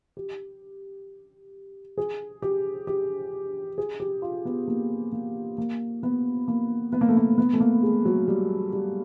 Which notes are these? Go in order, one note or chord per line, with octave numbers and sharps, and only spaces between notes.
G4
G#4
G4
G4
G#4
G4
F4
B3
A#3
A#3
A#3
B3
A#3
B3
A#3
A3
A#3
B3
A3
A#3
G#3
F#3
G3
G3